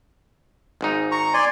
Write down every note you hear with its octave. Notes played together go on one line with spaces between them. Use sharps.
G#1 G#2 D#4
A#5 C#6
D5 G#5 C6